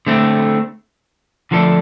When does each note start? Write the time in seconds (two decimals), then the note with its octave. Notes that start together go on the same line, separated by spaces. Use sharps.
0.07 D3 A3 C4
1.51 D3 F3 A3 D4 A4